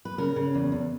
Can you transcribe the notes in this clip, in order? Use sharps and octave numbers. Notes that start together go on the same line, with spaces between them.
B4
C#3 A#4
C#3
E2
E2